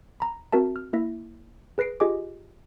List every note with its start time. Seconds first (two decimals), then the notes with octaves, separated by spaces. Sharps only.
0.20 A#5 B5
0.52 C4 F#4 A#4 E5 A5
0.76 F6
0.93 A#3 E4 E5 A#6
1.78 G#4 B4 A#6 C7 D7
2.00 F4 G4 G#4 D#5 G#5 D6